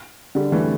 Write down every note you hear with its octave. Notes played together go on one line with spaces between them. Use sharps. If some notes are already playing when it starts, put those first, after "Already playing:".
D3 G3
E3 A3